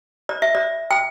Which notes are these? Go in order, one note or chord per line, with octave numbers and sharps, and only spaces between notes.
D5
E5
D5
G5